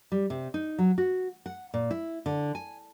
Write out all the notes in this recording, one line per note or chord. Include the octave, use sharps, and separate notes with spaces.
G3
C3
D#4
F#3
F#4
F#5
A#2
E4
D3
G#5